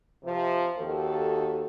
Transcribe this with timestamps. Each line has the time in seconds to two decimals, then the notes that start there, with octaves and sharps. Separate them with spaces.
0.24 C3 F3
0.77 D#2 D#3 F#4 A4